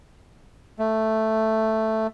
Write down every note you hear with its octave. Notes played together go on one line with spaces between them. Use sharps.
A3